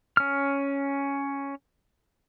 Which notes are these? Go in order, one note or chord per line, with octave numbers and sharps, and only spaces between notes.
C#4 F6